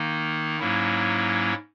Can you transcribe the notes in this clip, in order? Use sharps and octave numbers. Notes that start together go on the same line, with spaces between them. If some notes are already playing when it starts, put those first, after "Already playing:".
Already playing: D#3 A#3 D#4
G#2 F#3 A#3 C#4 E4